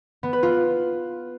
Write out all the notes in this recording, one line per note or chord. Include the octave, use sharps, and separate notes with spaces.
B3
B4
F4